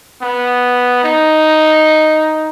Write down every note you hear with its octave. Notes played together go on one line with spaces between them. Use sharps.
B3
D#4